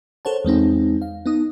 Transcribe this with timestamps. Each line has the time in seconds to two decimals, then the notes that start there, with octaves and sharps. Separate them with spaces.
0.25 A4 A#4 C5 C#5 F#5 A5
0.45 E2 G#3 C4 D#4
1.02 F5
1.26 B3 D#4 D#6